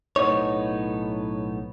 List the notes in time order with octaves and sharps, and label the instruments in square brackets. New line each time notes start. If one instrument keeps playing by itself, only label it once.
[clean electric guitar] B1 A2 B3 D#4 C#5